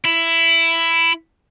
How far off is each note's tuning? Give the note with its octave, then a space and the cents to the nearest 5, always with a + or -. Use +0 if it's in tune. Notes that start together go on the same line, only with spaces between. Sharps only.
E4 +10